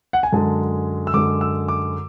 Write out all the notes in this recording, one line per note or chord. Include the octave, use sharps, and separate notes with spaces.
F#5
G#5
F#2 D3 G#3 A5
E6
F#2 D3 G#3 D6
E6
D6